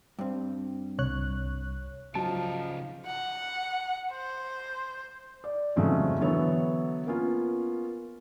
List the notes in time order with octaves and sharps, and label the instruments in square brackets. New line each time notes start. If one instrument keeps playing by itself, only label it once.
[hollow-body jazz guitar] G2 C4
[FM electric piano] C2 C#5 F#6
[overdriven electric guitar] C#3 D#4 [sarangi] F3 [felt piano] F#3 [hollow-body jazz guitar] A5
[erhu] F#5
C5
[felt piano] D5
F2 G#2 C#3 F#3 A3
D3 E3 F#3 B3 A4 C#5
A#3 B3 C#4 F4